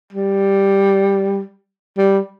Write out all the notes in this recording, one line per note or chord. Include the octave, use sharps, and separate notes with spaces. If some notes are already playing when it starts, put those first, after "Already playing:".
G3
G3